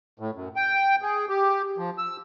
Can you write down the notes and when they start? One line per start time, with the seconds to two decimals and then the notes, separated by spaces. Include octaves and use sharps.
0.20 A2
0.35 F#2
0.56 G5
1.02 G#4
1.29 G4
1.78 F3
1.98 E6